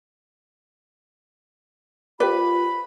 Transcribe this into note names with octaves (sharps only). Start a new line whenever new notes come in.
F4 G4 B4 C5 D5 B5